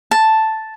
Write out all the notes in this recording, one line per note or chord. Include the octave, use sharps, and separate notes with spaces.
A5